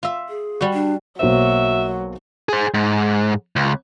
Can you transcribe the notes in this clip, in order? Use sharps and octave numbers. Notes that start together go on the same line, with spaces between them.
F4 E5
G#4
G3 F#4
D4
B1 F#3 A#3 C5 E5
G#4 C5
G#2
C#2